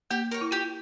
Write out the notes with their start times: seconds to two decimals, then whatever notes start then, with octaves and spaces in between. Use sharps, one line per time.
0.11 A#3 G4
0.31 A#4 C#5
0.41 E4
0.51 F4 G4